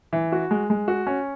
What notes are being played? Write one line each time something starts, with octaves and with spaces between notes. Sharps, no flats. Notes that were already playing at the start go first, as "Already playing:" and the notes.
E3
F#4
G#3
G#3
F#4
C#4